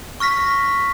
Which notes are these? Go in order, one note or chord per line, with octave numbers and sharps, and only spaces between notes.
C#6 F6 A#6 B6